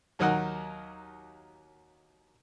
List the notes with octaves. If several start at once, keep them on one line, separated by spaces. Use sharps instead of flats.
D#2 F#3 D#4 A#4 F#5